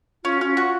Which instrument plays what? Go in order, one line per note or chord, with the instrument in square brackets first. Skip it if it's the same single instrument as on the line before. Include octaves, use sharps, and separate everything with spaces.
[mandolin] C#4 [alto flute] F4
[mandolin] C#4 [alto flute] F#4
[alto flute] F4
[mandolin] F#4